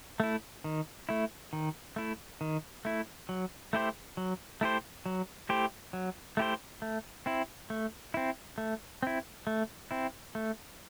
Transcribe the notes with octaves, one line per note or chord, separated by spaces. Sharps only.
A3 E4
D#3
A3 E4
D#3
A3 E4
D#3
A3 E4
F#3
A3 E4 G4 C5
F#3
A3 E4 G4 C5
F#3
A3 E4 G4 C5
F#3
A3 E4 G4 C5
A3
C4 E4
A3
C4 E4
A3
C4 E4
A3
C4 E4
A3